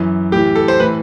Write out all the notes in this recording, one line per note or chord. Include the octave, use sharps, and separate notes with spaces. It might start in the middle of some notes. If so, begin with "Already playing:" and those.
Already playing: F#2 E3
A2 E3 G4
A4
C5
A2 E3 B4